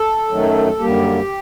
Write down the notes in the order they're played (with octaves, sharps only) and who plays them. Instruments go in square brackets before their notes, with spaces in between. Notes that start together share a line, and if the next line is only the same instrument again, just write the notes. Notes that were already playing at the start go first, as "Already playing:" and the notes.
Already playing: [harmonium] A4
F#2 D#3 F#3 A3
F#2 D3 G3 A#3 G4